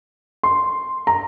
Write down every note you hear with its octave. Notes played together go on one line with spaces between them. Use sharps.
C6
A#5